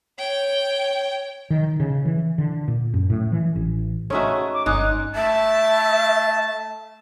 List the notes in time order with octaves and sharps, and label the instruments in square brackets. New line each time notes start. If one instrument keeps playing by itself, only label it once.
[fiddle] C#5 G5
[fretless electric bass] D#3
C#3
E3
D3
A#2
F#2
A2
E3
A1
[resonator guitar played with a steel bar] G#3 A3 F#4 [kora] C#4 D#4 E5
[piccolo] D6
[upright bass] G1 C#4 [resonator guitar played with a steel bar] G#3 D#4 [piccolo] F#6
[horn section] A3 A5 [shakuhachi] E5